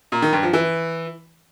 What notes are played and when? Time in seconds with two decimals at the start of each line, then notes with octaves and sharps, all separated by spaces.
0.12 A#2
0.22 D#3
0.33 G2
0.43 F3
0.53 E3